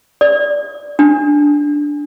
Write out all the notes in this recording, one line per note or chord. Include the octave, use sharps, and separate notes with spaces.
D5
D4